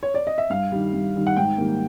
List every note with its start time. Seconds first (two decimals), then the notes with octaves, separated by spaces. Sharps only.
0.03 C#5
0.14 D5
0.27 D#5
0.38 E5
0.50 G2 F5
0.72 D#3 G3
0.93 G2
1.16 D#3 G3
1.27 F#5
1.37 G#2 G5
1.58 D#3 G3 A#3